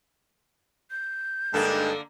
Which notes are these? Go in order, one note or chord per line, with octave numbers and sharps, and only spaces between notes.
G6
G2 D3 G#3 A#3 D#4 A4